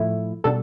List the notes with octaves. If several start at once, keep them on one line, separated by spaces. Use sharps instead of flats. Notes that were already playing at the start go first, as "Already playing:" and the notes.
Already playing: A2 F3 A3 E4
B2 G3 D4 A4